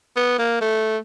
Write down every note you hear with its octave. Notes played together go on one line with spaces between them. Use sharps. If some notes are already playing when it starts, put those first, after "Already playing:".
B3
A#3
A3